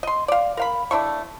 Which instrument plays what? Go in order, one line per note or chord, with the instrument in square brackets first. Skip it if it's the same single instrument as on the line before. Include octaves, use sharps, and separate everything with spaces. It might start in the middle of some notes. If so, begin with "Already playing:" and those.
[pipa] D#5 C6
D5 F5
A#4 F5 B5
A3 D4 E4 C#6